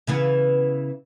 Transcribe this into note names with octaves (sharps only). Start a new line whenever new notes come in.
C#3 E3 B3